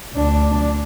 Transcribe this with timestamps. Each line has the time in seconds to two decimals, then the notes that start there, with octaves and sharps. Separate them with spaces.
0.14 D2 D4